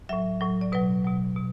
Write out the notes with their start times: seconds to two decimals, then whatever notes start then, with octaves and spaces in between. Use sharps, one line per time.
0.09 A2 F#3 E5
0.41 A2 F#3
0.61 D5
0.72 B2 F#3 B4
1.04 B2 F#3
1.36 B2